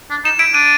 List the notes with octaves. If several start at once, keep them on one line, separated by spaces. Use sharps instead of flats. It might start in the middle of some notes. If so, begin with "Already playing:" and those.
D4
D#4 E7
E4 D7
D4 D#7